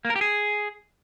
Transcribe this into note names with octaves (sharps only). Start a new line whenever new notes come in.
A#3
A#4
G4
G#4